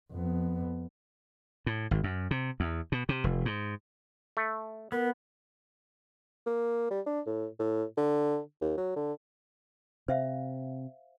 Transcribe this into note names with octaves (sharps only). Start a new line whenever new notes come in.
F2 B3
A2
G#1
F#2
C3
E2
B2
C3
F1
G#2
A3
B3 A#4
A#3
G3
D4
A2
A2
D3
D#2
F#3
D3
C3 C5 E5 F5